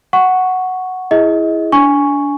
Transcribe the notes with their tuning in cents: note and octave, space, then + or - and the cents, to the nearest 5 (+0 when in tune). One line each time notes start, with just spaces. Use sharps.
F#5 +0 C#6 +0
E4 +0 G#4 +0 D#5 +30
D4 -25 G#5 +0 C#6 +0